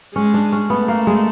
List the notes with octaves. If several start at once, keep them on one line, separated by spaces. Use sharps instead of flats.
G#3 C#4
D4
C#4
A3 B3
A#3
G#3